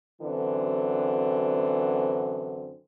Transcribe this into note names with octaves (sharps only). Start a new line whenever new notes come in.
F#2 D3 E3 C4